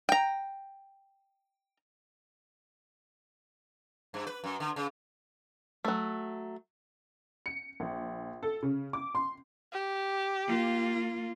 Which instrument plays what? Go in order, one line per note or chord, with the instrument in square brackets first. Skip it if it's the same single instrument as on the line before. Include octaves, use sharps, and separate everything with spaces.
[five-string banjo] G5 A#5
[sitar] G2
B4
F#2
D3
C#3
[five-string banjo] F#3 A3
[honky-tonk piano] C#7
A#1
A4
C#3
D6
C6
[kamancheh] G4
[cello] A#3 F4